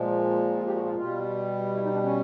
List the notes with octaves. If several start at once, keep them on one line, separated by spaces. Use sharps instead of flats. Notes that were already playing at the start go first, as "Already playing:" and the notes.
Already playing: A#2 F3 G#3
F4
G4
F#4
F4
B2 G3 F4
E4
D#4
D4
C#4